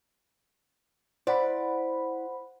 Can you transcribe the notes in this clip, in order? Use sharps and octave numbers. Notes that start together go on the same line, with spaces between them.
E4 C5 D5 F#5 B5